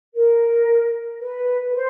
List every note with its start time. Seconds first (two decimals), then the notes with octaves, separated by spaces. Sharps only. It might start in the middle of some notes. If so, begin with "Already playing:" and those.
0.15 A#4
1.20 B4
1.69 B4
1.74 C5